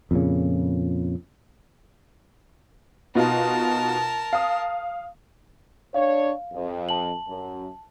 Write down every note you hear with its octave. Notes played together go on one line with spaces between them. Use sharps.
F2 A#2 C#3
B2 D#4 F4 A#4 A5
F5 D#6
D4 C#5 F5
F2
A5 F#7
F#2